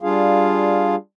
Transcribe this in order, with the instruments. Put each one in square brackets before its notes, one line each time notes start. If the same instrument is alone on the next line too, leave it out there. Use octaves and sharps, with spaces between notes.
[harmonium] G3 D4 F4 G#4 F5